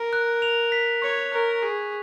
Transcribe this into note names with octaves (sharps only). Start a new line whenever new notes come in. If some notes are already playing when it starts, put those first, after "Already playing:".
Already playing: A#4
F#6
F7
B6
C#5 C#6
A#4 F#6
G#4 C#6